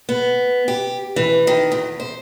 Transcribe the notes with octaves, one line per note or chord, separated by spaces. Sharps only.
B3
G4
E3
D#3
E2
C5